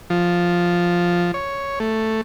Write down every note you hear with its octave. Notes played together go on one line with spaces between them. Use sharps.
F3
C#5
A3